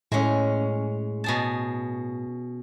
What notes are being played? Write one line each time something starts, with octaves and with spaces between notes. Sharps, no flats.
A2 G#3 C#4
B2 G#4 A5